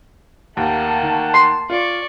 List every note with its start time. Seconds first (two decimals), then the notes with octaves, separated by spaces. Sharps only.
0.57 D#2 A3 A#3 F#5 G5 A5
1.03 D#3
1.34 C6
1.70 F4 D5 C#6